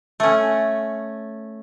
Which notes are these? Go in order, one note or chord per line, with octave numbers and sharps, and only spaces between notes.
A3 C#4